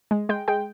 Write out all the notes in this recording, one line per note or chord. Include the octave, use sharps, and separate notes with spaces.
G#3
G#3 G5
G#3 G5